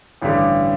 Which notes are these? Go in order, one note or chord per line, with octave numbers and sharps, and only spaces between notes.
A1 G2 D3 G3